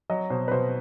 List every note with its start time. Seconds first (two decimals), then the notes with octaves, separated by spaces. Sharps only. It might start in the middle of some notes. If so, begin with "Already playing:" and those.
0.10 F#3 D#5
0.30 B2 C5
0.48 B4
0.51 B2 C5